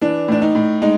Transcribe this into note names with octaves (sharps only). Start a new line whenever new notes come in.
E3 D4
A2 D4
D#4
A2
G#3 D#4